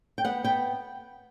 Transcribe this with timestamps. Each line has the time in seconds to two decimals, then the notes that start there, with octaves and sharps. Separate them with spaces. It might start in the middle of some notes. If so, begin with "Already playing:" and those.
0.18 G5
0.25 B3 F#5
0.44 B3 G5